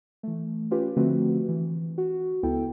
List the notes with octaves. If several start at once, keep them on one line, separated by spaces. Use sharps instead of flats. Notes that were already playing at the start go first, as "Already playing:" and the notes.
E3 A3
C#4 F4 G4 B4
D3 F3 A3 C4 F#4 B4
E3
F#4
C#2 B3 E4 A4 G5